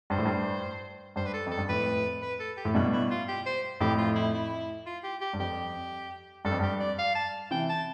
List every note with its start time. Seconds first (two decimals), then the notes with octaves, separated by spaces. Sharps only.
0.10 G2 C5
0.18 A2
0.25 G2
1.16 G2 C5
1.26 B4
1.33 A4
1.46 F2 A4
1.58 G2
1.69 F2 A2 B4
2.22 B4
2.39 A4
2.57 G4
2.65 A2
2.75 G2 B2 E4
2.92 E4
3.10 F4
3.28 G4
3.46 C5
3.81 F2 A2 G4
3.98 F4
4.15 E4
4.34 E4
4.86 F4
5.03 G4
5.21 G4
5.33 G2
5.40 F2 G4
6.45 G2 A4
6.52 F2
6.60 G2 G4
6.80 D5
6.98 F5
7.15 A5
7.51 C3 E3 G5
7.69 A5